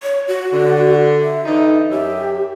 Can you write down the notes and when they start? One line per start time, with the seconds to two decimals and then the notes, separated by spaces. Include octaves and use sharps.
0.03 C#5
0.28 F#4
0.53 D3
1.22 E5
1.45 D3 E3 D#4
1.90 F#2 G4 E5